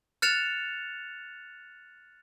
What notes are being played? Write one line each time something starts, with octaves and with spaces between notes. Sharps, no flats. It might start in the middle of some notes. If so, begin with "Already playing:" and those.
F6 F#6 A6 C#7 E7 F7